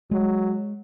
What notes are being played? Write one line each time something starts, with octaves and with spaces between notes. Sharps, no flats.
F#3 G#3